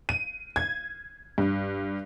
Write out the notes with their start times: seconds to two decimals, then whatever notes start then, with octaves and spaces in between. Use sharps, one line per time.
0.09 D#7
0.56 G#6
1.38 G2